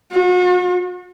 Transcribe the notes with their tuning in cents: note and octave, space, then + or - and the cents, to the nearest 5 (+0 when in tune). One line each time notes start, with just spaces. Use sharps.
F#4 -40